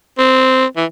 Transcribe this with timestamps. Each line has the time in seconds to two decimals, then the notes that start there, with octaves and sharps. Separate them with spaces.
0.18 C4
0.76 E3